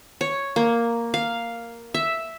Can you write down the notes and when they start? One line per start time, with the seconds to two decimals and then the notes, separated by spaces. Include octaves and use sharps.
0.21 C#5
0.56 A#3
1.14 F5
1.94 E5